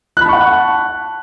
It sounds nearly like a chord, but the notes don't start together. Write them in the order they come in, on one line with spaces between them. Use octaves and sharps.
F#6 B5 A5 C#6 F#5